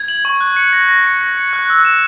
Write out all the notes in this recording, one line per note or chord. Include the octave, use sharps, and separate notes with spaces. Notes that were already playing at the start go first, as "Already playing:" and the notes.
Already playing: G#6
F#7
C#6
F#6
C#7
A#6
A#6
C#7
A#6
C#7
F#6
E6
E7